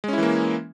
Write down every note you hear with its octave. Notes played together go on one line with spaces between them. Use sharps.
E3 G#3 A#3 C#4 E4